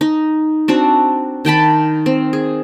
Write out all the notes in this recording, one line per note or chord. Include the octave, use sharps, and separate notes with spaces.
D#4
C4 D4 F#4
D#3 G5 A5 B5
C4
G#4